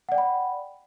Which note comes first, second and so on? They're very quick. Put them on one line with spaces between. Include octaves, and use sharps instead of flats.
F#5 D5 G5 B5